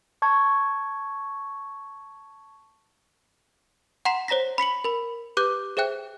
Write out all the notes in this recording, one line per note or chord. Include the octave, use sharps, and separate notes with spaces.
A5 C#6 G#6
F#5 A#5 C6 B6 C7 E7
C5 C#5 A#5 A#6 B6
B5 B6 C#7 F#7
A#4 B5
G4 B4 D6 F#6 G6
G#4 C5 E5 G5 F#6